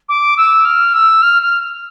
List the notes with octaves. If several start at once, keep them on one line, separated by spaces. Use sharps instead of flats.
D6
E6
F6
E6
F6
F6